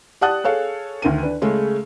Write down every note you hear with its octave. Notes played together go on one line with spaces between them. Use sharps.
G4 D5 F#5 A5 D#6 F#6
G#4 A4 C#5 F5
D2 D#3 A#4 D#7
D4 B4
C#3 G#3 A3 C#4